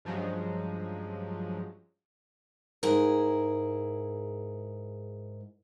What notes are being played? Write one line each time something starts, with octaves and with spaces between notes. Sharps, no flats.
G2 F3 F#3 G#3 C#4
G#2 E4 G#4 A#4